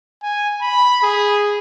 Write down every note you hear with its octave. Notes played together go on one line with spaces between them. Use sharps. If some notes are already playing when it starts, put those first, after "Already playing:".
G#5
B5
G#4